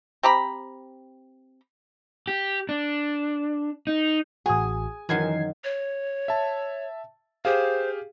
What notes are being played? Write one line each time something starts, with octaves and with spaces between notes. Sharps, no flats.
C4 G4 A#5 B5
G4
D4
D#4
A1 F#4 G#4 G#5 D#6
F#2 D#3 E3 F#3 G#6 C7
C#5
E5 A5
G4 G#4 C5 F5